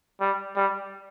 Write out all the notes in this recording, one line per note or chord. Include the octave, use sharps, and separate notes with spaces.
G3
G3